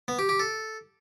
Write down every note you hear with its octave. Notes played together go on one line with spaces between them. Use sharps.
B3
G4
G4
A4